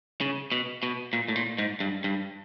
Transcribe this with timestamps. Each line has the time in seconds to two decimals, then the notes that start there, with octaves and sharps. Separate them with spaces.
0.21 C#3
0.52 B2
0.83 B2
1.13 A#2
1.28 A2
1.35 A#2
1.58 G#2
1.80 G2
2.04 G2